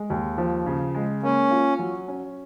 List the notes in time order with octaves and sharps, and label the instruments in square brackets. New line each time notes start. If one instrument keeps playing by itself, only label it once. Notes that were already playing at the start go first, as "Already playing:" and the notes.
Already playing: [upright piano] G#3
D#2
F3
C#3
G#3
[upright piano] A#3 [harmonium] C#4
[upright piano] F4
F#3
C#4